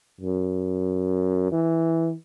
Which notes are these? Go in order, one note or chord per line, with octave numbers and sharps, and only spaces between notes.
F#2
E3